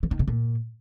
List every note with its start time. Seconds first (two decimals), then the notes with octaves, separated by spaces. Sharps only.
0.03 E3
0.11 D#3
0.19 B2
0.28 A#2